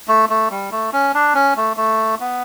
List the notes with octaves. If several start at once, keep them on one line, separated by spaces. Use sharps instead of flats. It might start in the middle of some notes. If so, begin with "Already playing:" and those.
A3
A3
G3
A3
C#4
D4
C#4
A3
A3
B3